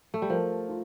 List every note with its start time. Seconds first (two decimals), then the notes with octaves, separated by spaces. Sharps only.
0.14 A3
0.22 G3
0.30 F3 A#4
0.69 F4